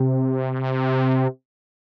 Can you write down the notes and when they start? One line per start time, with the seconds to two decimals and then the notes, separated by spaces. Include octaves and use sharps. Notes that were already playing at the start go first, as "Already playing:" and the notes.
Already playing: C3